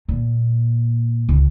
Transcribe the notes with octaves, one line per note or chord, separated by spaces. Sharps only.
A#2
C#2